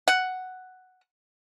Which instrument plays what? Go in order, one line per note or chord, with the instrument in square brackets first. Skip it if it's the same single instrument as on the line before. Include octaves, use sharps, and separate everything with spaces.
[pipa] F#5